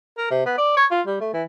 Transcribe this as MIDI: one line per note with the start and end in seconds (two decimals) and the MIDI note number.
0.18 0.26 70
0.31 0.43 48
0.46 0.54 59
0.58 0.76 74
0.77 0.85 73
0.91 1.01 65
1.06 1.17 55
1.20 1.30 57
1.33 1.43 52